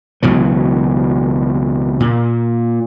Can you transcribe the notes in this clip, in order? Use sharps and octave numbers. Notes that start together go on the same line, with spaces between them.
C#2 B2 E3 F#3
A#2